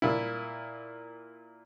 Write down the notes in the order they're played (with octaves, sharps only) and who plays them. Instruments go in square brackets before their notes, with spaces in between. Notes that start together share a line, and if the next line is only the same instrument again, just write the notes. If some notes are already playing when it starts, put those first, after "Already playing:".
[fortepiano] A#2 E4